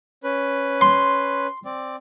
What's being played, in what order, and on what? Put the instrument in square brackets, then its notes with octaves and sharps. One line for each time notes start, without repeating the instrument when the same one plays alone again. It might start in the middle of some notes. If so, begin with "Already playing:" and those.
[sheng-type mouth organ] C#4 B4
[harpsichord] C6
[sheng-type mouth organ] C4 D5